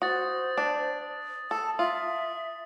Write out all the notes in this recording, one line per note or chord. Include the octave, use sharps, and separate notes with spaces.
F#4 C5 D#6 A6
D4
A4 A5
F4 E5 D#6